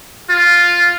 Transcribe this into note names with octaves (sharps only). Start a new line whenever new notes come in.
F4